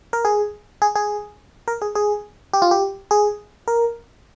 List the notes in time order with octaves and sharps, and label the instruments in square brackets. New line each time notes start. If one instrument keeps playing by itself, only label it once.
[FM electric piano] A#4
G#4
G#4
G#4
A#4
G#4
G#4
G4
F4
G4
G#4
A#4